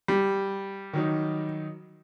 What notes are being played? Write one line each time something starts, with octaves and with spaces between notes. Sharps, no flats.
G3
D#3 F#3 D#4